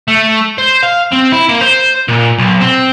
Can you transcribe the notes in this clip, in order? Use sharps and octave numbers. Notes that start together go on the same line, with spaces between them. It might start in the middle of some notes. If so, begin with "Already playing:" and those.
A3
C5
F5
C4
E4
A#3
C5
A#2
B1
C4